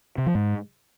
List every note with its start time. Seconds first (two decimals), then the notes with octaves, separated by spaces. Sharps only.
0.18 C3
0.26 F3
0.35 G#2